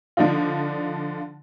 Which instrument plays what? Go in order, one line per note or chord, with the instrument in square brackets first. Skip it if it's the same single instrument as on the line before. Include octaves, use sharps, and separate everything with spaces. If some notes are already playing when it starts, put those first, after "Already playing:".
[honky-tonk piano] D3 F3 D4 D#4 F4